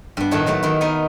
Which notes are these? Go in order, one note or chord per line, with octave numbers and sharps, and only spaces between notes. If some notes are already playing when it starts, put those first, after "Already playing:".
G2 B3
A2 D#3 E4 A4 C#5 F#5
D#3 F#3 A3 E4
D#3 E4
B3 D#4 A#4